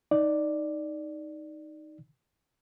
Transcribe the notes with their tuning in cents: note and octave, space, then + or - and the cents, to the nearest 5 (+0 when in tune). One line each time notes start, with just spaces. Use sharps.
D#4 +0 D5 +0